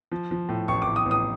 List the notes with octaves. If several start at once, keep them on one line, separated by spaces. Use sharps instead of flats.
F3
F3
A2
A1 C#6
D6
A2
D#6
A1
D#6